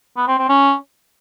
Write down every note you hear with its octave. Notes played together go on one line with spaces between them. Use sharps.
B3
C4
C4
C#4